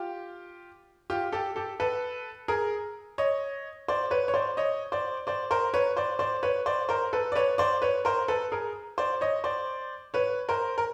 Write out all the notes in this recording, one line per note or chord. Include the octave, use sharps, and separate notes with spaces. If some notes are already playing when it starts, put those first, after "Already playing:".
Already playing: F4 G4
F4 G4
G4 A4
G4 A4
A4 B4
G#4 A#4
C#5 D#5
C5 D5
B4 C#5
C#5
C5 D5
C#5 D#5
C5 D5
C5 D5
A#4 C5
B4 C#5
C5 D5
C5 D5
B4 C#5
C5 D5
A#4 C5
A4 B4
D5
B4 C#5
C5 D5
B4 C#5
A#4 C5
A4 B4
G#4 A#4
C5 D5
C#5 D#5
C5 D5
B4 C#5
A#4 C5
A#4